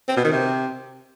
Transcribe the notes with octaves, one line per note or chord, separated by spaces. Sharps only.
C4
B2
D#3
C3